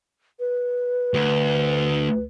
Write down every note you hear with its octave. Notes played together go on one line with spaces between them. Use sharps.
B4
D2